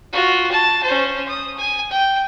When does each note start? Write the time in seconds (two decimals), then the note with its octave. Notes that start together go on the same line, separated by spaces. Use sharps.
0.12 F4 F#4
0.51 A5
0.83 C#4 C5
1.29 D#6
1.58 G#5
1.91 G5